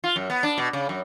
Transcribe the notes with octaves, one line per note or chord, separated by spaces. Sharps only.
F4
F#2
B3
D4
B2
C#3
F#2